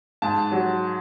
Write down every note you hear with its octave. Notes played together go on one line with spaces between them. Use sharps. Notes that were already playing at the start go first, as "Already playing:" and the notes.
G#2 A5
F#3